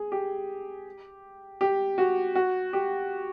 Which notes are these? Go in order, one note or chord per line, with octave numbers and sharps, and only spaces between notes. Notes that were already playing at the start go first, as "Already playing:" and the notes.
Already playing: G#4
G4
G4
F#4
F#4
G4